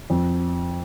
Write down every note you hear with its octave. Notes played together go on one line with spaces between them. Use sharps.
F2